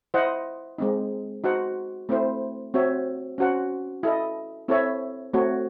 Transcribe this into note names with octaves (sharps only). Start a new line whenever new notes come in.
E4 C5 D#5 F#5
G#3 C4 D#4
D#4 F#4 C5 F#5
A3 C4 E4 C5
C4 F#4 C#5 E5
C#4 F#4 C5 F#5
E4 A4 D#5
C4 E4 A4 C#5 E5
A3 C4 F#4 C#5